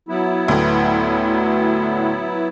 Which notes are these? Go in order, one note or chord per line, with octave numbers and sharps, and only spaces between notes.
F#3 B3 E4
D2 A2